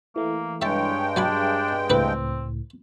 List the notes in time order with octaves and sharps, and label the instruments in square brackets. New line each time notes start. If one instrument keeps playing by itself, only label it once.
[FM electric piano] E3 A3 [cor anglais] A#3
[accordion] G2 G#3 G5 [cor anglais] C#5 [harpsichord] E5 A5
[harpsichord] F#3 G#5 B5 [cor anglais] D4 [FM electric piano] C#5
[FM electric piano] C#2 A2 [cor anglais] C4 [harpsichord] D4 B4